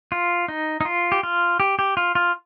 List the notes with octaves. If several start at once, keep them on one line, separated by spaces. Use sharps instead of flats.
F4
D#4
D#4
F4
G4
F4
G4
G4
F4
F4